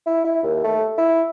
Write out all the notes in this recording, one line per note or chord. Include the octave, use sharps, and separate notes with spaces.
E4
E4
D#2
A3
E4